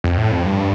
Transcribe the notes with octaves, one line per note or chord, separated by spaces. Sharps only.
F2
A2
F2
G2